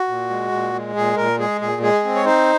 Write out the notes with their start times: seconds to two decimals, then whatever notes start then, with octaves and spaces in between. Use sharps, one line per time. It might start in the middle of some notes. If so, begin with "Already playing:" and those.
Already playing: F#4
0.08 A#2
0.30 G#3
0.52 A#2
0.74 G#3
0.96 A#2 G#4
1.16 A#2 A#4
1.39 G#3 G#4
1.61 A#2 G#4
1.82 G#3 G#4
2.04 C4
2.15 C#5
2.25 D#4 C5